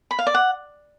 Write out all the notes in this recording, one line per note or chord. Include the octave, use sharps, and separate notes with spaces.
B5
F5
D5
F#5